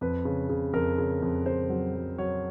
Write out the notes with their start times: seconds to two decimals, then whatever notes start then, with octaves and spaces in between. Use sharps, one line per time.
0.01 F2 B4
0.25 C#3
0.49 C#3
0.73 F2 A#4
0.98 C#3
1.22 F2
1.46 C#3 C5
1.70 F#3
1.95 F#3
2.18 F#3 C#5